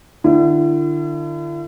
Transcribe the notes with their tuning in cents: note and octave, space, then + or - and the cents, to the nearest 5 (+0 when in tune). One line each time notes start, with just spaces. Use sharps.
D3 +35 E4 +45